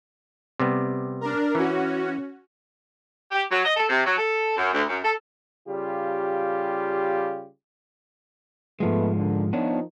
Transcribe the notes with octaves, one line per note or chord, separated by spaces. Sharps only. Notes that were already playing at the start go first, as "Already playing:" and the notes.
C3 G3 B3
D4 A#4
E3 C#4 F#4
G4
F#3
D#5
A4
C3
F#3
A4
F#2
D2
F#2
A4
C#3 G3 F4 G4
G#2 F3 G#3 A3 B3
A#2 D3
D#3 F3 B3 D4 C#5